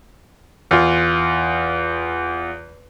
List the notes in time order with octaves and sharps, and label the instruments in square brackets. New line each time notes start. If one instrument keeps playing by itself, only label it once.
[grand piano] E2 F4